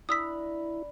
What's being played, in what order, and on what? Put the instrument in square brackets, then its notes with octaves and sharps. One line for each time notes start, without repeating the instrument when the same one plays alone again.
[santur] D4 A#5 B5 [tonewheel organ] E4 [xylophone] D#6 E6 B6